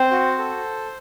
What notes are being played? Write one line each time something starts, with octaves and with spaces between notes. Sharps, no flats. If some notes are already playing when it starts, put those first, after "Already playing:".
Already playing: C4 C5
F#4
A4